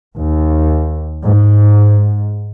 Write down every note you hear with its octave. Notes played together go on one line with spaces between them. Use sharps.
D#2
G#2